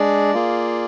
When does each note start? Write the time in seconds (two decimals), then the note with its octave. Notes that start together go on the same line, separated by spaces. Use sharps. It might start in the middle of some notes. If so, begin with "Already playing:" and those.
Already playing: G#3 D4 G#4 D5
0.34 A#3 F4 G#4